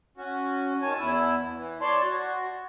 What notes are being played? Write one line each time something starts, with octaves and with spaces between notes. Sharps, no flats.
C#4 F#4
D#3 C#5 G#5 A5
E2 E4 E6
E3
C#5 D5 A5 C6
F#4